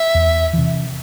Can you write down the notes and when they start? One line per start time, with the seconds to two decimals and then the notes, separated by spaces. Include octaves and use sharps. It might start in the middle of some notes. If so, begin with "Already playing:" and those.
Already playing: E5
0.14 E2
0.53 C3 E3